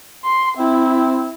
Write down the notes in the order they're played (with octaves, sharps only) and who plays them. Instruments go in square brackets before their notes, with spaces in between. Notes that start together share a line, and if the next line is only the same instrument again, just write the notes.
[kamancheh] C6
[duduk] C4 [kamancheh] E4